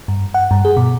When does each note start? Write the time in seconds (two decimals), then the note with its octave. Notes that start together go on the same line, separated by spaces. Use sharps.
0.08 G2
0.34 F#5
0.51 G2
0.65 G#4
0.77 B2